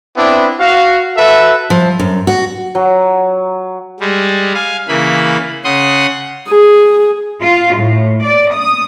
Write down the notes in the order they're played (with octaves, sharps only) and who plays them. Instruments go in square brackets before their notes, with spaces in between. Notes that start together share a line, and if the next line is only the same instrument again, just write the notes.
[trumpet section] B3 C4 D4 E4
F#4 F5
F#4 A4 B4 E5
[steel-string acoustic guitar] F3
F#2
F#4
[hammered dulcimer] F#3
[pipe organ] G3 G#3
F5 G#5
C#3 E3 A#3 B5
C#3 F#5 C6 D#6
[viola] G#4
[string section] F4
A2
D5
D#6